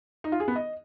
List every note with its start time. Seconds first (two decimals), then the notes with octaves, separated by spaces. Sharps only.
0.24 D#4
0.32 F4
0.40 G#4
0.48 B3
0.56 D#5